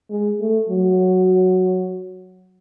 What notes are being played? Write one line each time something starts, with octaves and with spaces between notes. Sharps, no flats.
G#3
A3
F#3